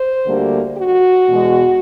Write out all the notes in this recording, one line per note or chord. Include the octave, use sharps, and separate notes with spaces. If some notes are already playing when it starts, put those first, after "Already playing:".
Already playing: C5
D2 D3 G3 A#3
F#4
E2 B2 G#3